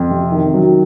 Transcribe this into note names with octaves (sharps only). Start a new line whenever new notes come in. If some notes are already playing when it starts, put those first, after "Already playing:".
Already playing: F2
C3
D#3
F#3